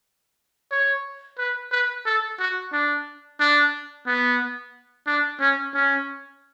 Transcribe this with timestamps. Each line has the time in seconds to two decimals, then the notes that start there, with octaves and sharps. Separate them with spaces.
0.71 C#5
1.38 B4
1.72 B4
2.06 A4
2.39 F#4
2.72 D4
3.40 D4
4.07 B3
5.07 D4
5.40 C#4
5.75 C#4